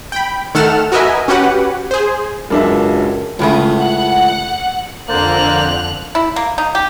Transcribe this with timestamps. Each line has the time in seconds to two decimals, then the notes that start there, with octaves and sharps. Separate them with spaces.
0.12 G5 B5
0.55 D#3 A3 A4 F#5 F6 E7
0.92 F#4 A#4 B4 D#5 E5 G#5
1.28 C#4 F#4 G4 B4 F#5
1.91 G#4 C5
2.50 F#1 C#2 F#2 D4 E5
3.39 C#2 A2 C#3 A3 F4
3.78 F#5
5.09 F2 D3 A#3 C5 D5 F#6 F7
6.15 E4
6.36 A#3
6.58 D#4
6.75 G4